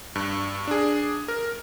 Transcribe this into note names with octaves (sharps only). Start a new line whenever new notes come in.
G2
D4 G#4
A#4